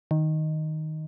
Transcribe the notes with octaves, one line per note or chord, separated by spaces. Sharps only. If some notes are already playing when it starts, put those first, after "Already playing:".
D#3